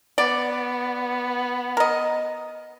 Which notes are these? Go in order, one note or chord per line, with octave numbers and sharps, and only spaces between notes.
B3 D5
A#4 D#5